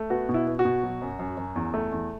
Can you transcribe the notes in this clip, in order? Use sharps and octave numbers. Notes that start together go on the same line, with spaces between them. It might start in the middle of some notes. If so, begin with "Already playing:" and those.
Already playing: A3
B3 F#4
B2
E4
B3
F#4
B2
F#3
F#2
F#2
F#2
E2
A3
E2